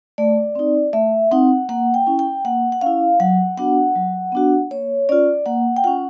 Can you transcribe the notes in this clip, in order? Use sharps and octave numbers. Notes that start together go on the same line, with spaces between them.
A3 D5
C4 D#4
A3 E5
C4 D#4 F#5
A#3 F#5
G5
C#4 E4
G5
A#3 F#5
F#5
C#4 E4 F5
F#3 F#5
B3 D4 F#4 F#5
F#3
B3 D4 F#4
A#3 C#5
C#4 F4 D5
A#3 F#5
G5
C#4 F4 F#5